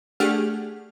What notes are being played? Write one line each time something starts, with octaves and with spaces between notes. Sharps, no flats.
A3 D4 G4 G#4 F#5 F6